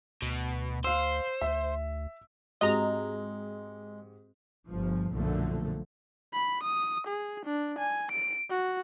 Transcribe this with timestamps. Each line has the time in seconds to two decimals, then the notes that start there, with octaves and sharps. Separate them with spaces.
0.22 D2 B2
0.84 C5 F5 E6
1.41 D2 E5
2.61 G#2 G#3 C4 F#4 G4 D#5 A#5
4.68 G1 F3
5.12 B1 F#2 A#2 D3 F3 A3
6.33 B5
6.63 D#6
7.07 G#4
7.45 D4
7.78 G#5
8.12 D7
8.50 F#4